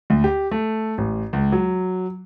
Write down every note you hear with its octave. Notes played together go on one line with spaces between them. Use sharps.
D2
G4
A3
A1
C#2
F#3